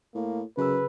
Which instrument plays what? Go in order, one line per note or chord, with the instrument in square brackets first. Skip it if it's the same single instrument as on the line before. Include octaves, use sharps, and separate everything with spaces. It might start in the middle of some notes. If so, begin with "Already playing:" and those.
[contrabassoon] A2 [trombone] A#3
[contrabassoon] F#2 [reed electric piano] C#3 G#4 E6 [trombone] B4